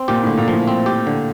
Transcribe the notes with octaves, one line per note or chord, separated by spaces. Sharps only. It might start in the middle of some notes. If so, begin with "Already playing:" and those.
Already playing: C4
A#2 G4
A2 D3
A#2
A2 F3
C4
G4
D3